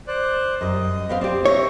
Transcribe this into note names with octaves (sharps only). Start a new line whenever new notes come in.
C5 D5 F#6
F#2 G3 D#5
B3 C4 F5
C4 G4 D5
C#5 E5 A#5